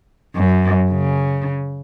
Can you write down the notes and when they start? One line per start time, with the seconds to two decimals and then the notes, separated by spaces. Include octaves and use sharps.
0.36 F#2
0.90 C#3